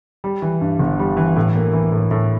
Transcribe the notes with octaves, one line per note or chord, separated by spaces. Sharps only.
G3
E3
G2
G1
G3
E3
A2
A#3
E3
A2
A2